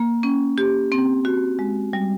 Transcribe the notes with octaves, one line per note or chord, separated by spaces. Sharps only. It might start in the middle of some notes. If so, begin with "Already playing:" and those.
Already playing: A#3
C#4
G4
C4
F#4
G#3
G3